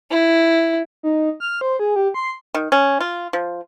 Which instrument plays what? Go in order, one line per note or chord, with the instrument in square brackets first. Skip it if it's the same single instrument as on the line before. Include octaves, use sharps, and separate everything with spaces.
[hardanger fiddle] E4
[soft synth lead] D#4
F6
C5
G#4
G4
C6
[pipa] D#3
C#4
F4
F3